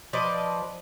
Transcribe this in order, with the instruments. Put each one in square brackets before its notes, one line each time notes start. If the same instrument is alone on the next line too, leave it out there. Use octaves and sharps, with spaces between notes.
[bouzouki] F3 B4 D5 D#5